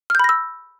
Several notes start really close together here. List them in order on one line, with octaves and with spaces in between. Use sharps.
F6 G6 B5 A#6 E6